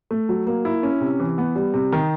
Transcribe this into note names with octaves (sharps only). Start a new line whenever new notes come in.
A3
F#3
A#3
E4
C#4
C3
E3
B3
G3
C3
D#3